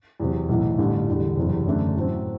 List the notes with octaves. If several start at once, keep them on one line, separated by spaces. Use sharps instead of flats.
E2 C3 F#3
B1 A2 E3
A1 G2 D3 G3 D4
E2 D3 G3
F#1 E2 C3
F#2 D3 A3 D4
A2 F#3 C4